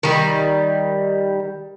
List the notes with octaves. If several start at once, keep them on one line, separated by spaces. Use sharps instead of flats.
D#3 G3